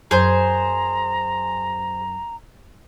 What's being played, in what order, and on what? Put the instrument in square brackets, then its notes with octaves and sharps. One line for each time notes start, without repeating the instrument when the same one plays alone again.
[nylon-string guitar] F#2 [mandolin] G#4 C5 [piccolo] A#5